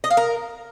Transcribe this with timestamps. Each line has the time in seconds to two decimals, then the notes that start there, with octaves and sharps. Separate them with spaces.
0.04 D#5
0.10 F5
0.17 A#4